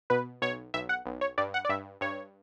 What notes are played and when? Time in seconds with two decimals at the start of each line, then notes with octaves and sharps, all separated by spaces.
0.10 B2 B4
0.42 B1 C#5
0.74 B1 E5
0.89 F#5
1.06 B1
1.21 C#5
1.38 G2 D5
1.54 F#5
1.65 D5
1.69 G2 E5
2.01 G2 C#5